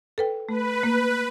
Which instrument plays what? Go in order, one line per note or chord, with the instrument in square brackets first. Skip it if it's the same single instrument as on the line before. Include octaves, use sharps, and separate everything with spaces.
[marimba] A4 B4 G5
[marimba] A3 [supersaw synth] B4
[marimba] A#3